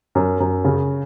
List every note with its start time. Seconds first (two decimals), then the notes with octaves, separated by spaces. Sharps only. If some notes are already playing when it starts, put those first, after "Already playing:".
0.15 F#2
0.40 F#2
0.65 C#3